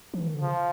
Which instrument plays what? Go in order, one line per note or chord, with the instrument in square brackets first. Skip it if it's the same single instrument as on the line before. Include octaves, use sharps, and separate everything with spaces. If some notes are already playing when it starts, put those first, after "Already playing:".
[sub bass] F3
E3
D#3
D3
[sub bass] C#3 [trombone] F3